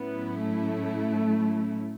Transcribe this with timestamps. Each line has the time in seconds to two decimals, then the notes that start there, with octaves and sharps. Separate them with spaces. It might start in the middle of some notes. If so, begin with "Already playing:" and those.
Already playing: A2 F#3 B3 C#4 E4
0.39 A3